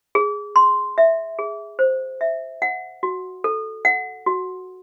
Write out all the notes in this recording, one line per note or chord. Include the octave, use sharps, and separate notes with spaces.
G#4
C6
E5
G#4
C5
E5
F#5
F#4
A4
F#5
F#4